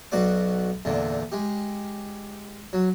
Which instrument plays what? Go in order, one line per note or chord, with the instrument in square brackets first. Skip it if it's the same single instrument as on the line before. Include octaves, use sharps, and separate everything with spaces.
[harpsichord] B1 B2 F#4 D5 D6
E2 A#2 D3
G#3 G4
F#3